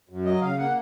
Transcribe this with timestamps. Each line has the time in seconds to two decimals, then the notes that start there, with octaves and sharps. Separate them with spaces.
0.09 F#2
0.25 F#3 D#5
0.42 C#3 F5
0.58 A#3 F#5